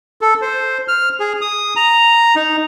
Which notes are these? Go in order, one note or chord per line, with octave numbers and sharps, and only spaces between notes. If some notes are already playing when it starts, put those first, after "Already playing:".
A4
C5
F6
G#4
D#6
A#5
D#4